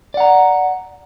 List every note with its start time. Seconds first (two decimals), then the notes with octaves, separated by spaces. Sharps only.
0.14 D5
0.17 F#5
0.20 A#5